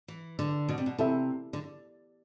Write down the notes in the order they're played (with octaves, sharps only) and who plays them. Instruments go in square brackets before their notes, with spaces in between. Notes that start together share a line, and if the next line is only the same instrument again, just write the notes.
[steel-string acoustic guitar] E3
D3
B2
C3
B2
[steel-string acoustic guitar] C3 [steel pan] E4 A4 E5
[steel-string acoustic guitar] D3